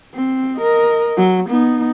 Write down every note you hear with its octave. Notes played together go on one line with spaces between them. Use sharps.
C4
A#4 D#5
F#3
B3 D#4